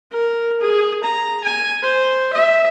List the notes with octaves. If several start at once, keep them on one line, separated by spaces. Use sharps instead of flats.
A#4
G#4
A#5
G#5
C5
E5